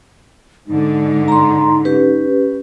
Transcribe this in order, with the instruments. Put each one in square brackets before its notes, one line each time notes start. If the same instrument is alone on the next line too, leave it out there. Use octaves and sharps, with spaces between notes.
[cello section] G#2 D3 [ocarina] D#4
[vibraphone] A#5 C6
C#4 G4 B4